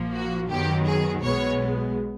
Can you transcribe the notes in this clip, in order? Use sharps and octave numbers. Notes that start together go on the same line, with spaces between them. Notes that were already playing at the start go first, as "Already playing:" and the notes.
Already playing: A#1 A#2 F3 A#3
F#4
F#2 D#3 F#3 B3 G4
G#4
B1 B2 G#3 B3 C#5